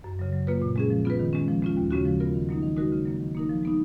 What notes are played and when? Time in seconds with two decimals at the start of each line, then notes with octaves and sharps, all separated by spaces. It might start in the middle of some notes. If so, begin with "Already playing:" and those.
0.04 F#2
0.19 C#3 F#3
0.32 F#3
0.47 A#3 F4 B4
0.62 A#2
0.76 G#3 C#4 G#4
0.90 F3
1.05 B3 F4 B4
1.19 D#3
1.33 G#3 C#4
1.48 F3
1.62 G#3 C#4 F4
1.77 D#2
1.91 C#3 G#3 C#4 F#4
2.05 F3
2.20 B3 F4 A#4
2.34 D#3
2.49 F#3 A#3 D#4
2.62 D#3
2.77 G#3 D#4 F#4 A#4
2.92 C#3
3.06 F#3 A#3
3.20 D#3
3.35 A#3 D#4 A#4
3.49 F3
3.63 G#3 B3 D#4